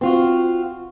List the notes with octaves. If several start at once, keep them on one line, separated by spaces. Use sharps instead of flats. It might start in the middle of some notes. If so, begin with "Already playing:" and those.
C4 F4 F#4